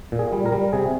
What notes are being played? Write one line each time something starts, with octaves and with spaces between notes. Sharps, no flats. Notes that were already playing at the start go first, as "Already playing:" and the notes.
A#2
G#4
G3
A#4
G3
C3 G#4